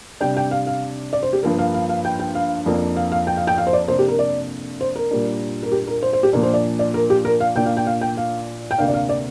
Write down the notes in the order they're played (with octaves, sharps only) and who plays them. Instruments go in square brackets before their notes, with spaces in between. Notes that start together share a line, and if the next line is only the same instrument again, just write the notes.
[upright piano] C3 G3 D4 [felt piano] G5
[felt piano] G5
F5
F5
D5
C5
G4
[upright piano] G2 F3 A#3 [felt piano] A#4
[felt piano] F5
F5
F5
G5
G5
F5
[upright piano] F2 F3 A#3 D4
[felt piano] F5
F5
G5
F5
G5
F5
C5
D5
[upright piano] C3 A#3 D4 [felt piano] C5
[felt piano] G4
A#4
D5
C5
A#4
[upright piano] A#2 G3 A#3 D4
[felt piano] A#4
G4
A#4
C5
C5
G4
[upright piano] A#2 F3 A#3 D4 [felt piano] A#4
[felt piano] C5
D5
D5
A#4
G4
A#4
F5
[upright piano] A#2 A#3 D4 [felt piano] G5
[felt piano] F5
G5
F5
G5
F5
G5
[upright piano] D2 C3 A#3 D4 [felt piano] F5
[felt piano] D5
F5
D5